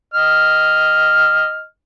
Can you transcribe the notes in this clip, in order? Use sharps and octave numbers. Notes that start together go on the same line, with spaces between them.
D#5 F6